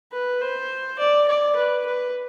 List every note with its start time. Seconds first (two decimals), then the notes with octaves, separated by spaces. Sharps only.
0.13 B4
0.41 C5
0.99 D5
1.29 D5
1.56 B4
1.86 B4